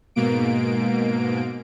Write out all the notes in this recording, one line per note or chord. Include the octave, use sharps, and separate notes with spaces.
G#2 B2 A#3 D7